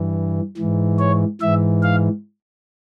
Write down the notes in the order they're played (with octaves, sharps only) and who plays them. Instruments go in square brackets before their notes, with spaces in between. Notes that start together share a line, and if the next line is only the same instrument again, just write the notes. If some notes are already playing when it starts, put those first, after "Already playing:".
Already playing: [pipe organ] G2 E3
G#2 E3
C#5
G#2 E3 E5
F5